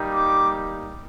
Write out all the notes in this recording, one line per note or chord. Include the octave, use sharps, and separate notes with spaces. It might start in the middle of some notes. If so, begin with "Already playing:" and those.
Already playing: G3 A#3 D#4 G4
D6